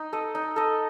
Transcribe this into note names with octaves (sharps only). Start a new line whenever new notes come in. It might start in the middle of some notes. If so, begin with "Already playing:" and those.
Already playing: D#4
A4 D#5
D#4
A4 D#5